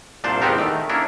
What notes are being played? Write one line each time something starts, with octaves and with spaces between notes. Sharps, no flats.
C2 A#2 D4 C5 A5
E2 A#2 B3 C4 G4 A#4
D#3 A3
A#3 C#4 D4 E4 A#4